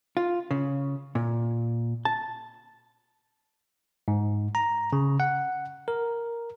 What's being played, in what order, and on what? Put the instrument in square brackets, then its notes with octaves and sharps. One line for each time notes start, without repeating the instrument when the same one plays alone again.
[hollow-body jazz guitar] F4
C#3
A#2
A5
[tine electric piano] G#2
A#5
C#3
F#5
A#4